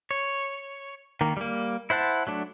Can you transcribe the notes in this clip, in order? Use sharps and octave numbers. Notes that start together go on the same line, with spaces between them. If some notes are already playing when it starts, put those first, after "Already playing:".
C#5
D#3 A#3
G3 A#3
E4 C5 F#5 A5
F#3 A3 D4